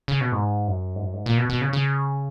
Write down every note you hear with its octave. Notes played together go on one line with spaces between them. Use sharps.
C#3
B2
G#2
F#2
G#2
F#2
G#2
A#2
B2
B2
C#3
C#3